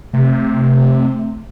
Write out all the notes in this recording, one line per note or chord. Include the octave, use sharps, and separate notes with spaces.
C3 A3